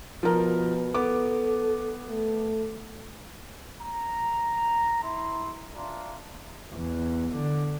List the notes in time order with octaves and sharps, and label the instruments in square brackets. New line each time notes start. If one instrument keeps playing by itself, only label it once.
[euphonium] B2 [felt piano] F3 A#4
[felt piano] B3 D6 [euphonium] A4
[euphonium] A3
[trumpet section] A#5
E4 C6
D4 F4 E5 A#5 C6
[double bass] E2
D3